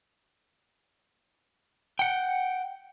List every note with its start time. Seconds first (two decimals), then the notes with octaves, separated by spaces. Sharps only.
1.99 F#5 G5